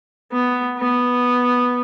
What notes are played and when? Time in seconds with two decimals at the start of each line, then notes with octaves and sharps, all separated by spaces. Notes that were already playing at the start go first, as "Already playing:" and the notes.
0.32 B3
0.78 B3